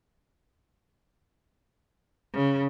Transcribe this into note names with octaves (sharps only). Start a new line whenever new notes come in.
C#3